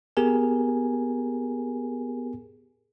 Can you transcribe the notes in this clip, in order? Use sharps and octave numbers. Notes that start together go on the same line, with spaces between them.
B3 G4 G#4 A#4 G#5